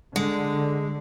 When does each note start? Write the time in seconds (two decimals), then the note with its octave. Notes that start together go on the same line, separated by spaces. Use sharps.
0.16 D3 G#3